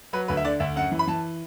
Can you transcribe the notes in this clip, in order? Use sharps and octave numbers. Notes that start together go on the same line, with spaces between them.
F#3 B4
D2 B4
E5
D3 D5
D2 E5
F#2 F#5
E3
B5
E3 A5